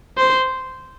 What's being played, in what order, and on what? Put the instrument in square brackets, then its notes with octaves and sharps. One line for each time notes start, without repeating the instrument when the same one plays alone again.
[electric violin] C5